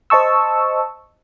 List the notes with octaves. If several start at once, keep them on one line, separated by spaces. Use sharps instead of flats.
C5 D#5 A5 C#6 E6